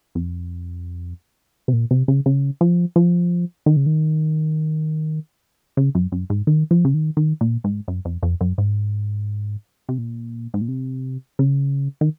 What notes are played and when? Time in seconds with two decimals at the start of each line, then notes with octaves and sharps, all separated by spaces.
0.15 F2
1.68 C3
1.73 A#2
1.91 C3
2.08 C#3
2.26 C#3
2.61 F3
2.96 F3
3.66 D#3
3.76 C#3
3.86 D#3
5.77 C#3
5.95 F#2
6.12 F#2
6.30 G#2
6.47 D#3
6.71 F3
6.85 C#3
6.94 D#3
7.17 D#3
7.41 A#2
7.64 G#2
7.88 F#2
8.05 F2
8.23 F2
8.41 F#2
8.58 G#2
9.89 C3
9.98 A#2
10.54 G#2
10.61 A#2
10.68 C3
11.39 C#3
12.01 D#3